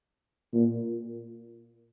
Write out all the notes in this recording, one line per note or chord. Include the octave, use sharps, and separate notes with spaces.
A#2